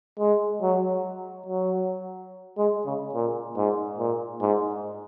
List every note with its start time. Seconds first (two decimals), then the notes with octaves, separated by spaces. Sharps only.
0.19 G#3
0.62 F#3
1.46 F#3
2.58 G#3
2.85 C#3
3.14 A#2
3.56 G#2
3.98 A#2
4.41 G#2